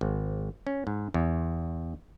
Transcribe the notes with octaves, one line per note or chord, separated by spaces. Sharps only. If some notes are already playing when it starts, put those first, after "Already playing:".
G#1
C#4
G#2
E2